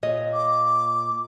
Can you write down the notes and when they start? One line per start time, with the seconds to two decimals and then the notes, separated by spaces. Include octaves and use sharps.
0.03 A#2 C#5 D#5
0.33 D6